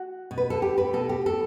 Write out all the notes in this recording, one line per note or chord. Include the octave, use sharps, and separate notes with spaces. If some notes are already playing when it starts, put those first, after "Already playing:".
Already playing: F#4
B2
B4
A4
G4
B4
B2 A4
G4
A4